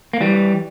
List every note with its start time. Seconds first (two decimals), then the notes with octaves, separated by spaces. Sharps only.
0.13 A#3
0.21 E3 G3